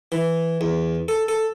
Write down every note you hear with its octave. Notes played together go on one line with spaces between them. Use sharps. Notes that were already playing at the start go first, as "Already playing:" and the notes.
E3
E2
A4
A4